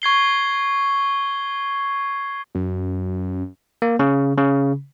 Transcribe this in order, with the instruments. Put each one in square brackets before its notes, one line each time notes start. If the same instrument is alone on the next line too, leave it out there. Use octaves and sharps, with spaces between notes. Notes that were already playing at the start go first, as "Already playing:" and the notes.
[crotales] C#6 G#6 C7 G7
[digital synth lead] F#2
[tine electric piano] A#3
C#3
C#3